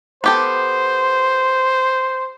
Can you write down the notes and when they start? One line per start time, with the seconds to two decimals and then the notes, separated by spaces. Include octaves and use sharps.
0.24 B3 G4 A4 C5